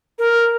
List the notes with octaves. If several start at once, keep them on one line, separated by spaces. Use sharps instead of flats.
A#4